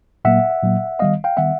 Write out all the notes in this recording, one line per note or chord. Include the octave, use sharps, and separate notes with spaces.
A#2 F#3 A#3 E5 F#5
A#2 F#3 A#3
D#3 G3 B3 D#5 F5
F5 G5
D#3 G3 B3 E5 F#5